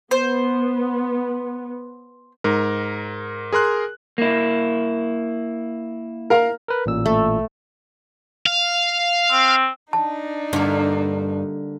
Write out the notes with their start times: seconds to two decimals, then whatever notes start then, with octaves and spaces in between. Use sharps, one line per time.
0.11 B3 C5
2.44 G#2 A#4
3.53 G#4 A#4 C6 F#6
4.18 A#3 E4
6.30 A#4 F5 A#5
6.68 A#4 B4
6.86 A1 A#2 E6
7.06 A3
8.46 F5
9.31 C4
9.93 D4 D#4 A5
10.53 G2 D3 A#3